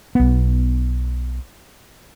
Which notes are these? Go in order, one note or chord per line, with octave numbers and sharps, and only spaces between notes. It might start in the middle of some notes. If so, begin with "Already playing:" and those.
B1 B3